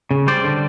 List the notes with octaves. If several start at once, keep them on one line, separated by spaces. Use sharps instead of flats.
C#3
G3 C5 D5
D3